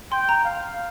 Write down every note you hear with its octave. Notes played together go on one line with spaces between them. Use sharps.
G5 C6
A#5
F5